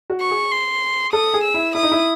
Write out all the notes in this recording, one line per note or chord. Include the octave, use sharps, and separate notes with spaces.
F#4
C#6
G#4
C6
A4 D#6
G#4
E6
E4
E4 D#6
D#4
E4